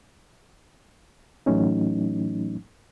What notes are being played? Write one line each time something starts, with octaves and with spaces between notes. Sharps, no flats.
A2 E3 F#3 A3 C#4 D#4